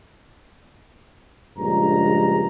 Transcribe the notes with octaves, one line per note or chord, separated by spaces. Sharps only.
A#1 G2 C#3 G#3 A#5